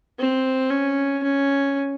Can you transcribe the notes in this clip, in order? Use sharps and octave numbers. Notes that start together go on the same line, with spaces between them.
C4
C#4
C#4